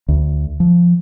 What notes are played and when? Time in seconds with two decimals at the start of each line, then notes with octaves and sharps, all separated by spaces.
0.08 D2
0.60 F3